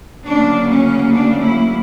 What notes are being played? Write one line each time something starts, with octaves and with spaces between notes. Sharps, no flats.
D2 C#3 F#3 A#3 D4
C#4
D4
E4